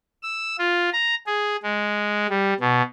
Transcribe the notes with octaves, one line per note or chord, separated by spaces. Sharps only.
E6
F4
A#5
G#4
G#3
G3
B2